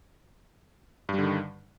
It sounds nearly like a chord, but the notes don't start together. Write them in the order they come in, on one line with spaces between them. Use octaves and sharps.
G2 G3 D3 D#3